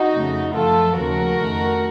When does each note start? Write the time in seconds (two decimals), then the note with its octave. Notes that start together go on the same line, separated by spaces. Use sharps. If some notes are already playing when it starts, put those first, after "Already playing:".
Already playing: D#4 F#4
0.11 F2 C#3 A3
0.53 F#2 F3 A3 F4 A4
0.96 D#2 C#3 F3 A3 F#4 A#4
1.40 F2 D#3 A3